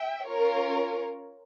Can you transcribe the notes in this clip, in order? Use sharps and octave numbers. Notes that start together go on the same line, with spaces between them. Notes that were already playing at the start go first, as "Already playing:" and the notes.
Already playing: E5 G5
C#4 F4 A#4 C#5